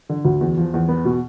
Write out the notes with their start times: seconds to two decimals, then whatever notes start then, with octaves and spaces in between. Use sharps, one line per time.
0.09 D3
0.25 D2
0.41 E2
0.58 F3
0.74 E2
0.89 B3
1.05 B2